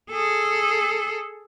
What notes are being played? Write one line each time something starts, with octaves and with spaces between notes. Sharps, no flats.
G#4 A4